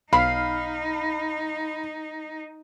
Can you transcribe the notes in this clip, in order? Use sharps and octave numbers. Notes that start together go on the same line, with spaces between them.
B1 D#4 F5 B5